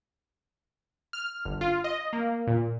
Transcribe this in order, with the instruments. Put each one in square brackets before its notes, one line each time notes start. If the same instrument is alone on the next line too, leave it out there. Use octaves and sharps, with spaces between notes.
[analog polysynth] F6
G1
F4
D#5
A#3
A#2